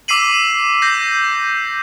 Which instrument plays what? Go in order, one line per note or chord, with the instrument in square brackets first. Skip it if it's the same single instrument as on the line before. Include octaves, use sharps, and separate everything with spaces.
[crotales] D6 E6 B6 C7 D#7 F#7
G6 A#6 C7